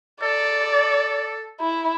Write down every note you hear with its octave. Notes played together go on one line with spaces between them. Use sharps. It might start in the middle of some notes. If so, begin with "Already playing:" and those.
A4 D5
E4